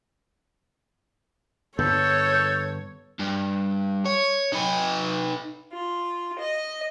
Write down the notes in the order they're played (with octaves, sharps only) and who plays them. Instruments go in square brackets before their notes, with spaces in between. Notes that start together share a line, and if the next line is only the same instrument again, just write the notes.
[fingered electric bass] G2 D3 B3 [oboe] A4 [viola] C#5 [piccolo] G6
[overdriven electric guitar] G2
C#5
D#4 B4
[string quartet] F4
D#5